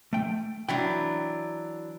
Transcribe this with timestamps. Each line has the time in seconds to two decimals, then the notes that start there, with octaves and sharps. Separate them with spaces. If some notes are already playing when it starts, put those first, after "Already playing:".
0.13 A3 G5
0.69 E3 F#3 D4 G5